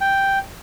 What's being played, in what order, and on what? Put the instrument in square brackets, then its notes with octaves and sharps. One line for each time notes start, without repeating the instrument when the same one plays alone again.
[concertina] G5